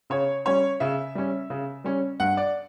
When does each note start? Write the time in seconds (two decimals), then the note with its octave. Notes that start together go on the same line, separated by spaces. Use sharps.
0.10 C#3 C#5
0.45 G3 C#4 C#5
0.80 C#3 E5
1.15 G3 C#4
1.50 C#3
1.84 G3 C#4
2.20 G2 F#5
2.37 D5